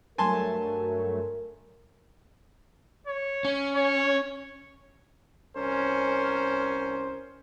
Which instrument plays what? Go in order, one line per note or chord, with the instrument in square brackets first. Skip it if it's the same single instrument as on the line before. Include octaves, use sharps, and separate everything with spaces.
[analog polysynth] G2 F#3 A3 [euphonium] A#4 [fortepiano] G#5 A5 C6
[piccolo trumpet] C#5
[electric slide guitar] C#4
[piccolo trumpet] C#5
[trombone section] C2 C#4 A#4 C5